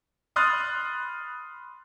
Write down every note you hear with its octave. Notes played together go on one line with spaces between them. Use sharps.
B5 C6 D#6 F6 F#6 A6